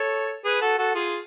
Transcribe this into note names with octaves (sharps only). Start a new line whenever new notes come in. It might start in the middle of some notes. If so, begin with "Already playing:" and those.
Already playing: A4 C#5
G#4 B4
F#4 A4
F#4 A4
F4 G#4